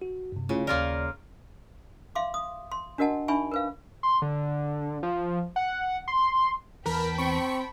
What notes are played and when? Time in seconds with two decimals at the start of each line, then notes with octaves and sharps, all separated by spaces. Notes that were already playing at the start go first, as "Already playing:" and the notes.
0.02 F#4
0.32 G2 C3
0.49 C#3 A3 E4 F4
0.67 D#2 A#3 F4 A#4 D5
2.15 E5 F5 C6 D6
2.34 D#6
2.72 C6
2.98 D4 F#4 A#4 D#5 F#5 A5
3.28 D4 D#4 E5 G#5 B5 C#6
3.52 A#4 B4 F5
4.03 C6
4.22 D3
5.03 F3
5.56 F#5
6.08 C6
6.86 E2 A#4 B4 G5 A5 B5
7.18 C4 C#6